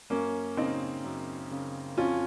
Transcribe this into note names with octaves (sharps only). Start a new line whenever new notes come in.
F#2 A#3 C#4
C#3 C4 D#4
F#2
C#3
F2 C#4 F4